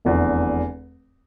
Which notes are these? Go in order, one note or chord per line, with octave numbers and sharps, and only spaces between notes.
F1 E2 D3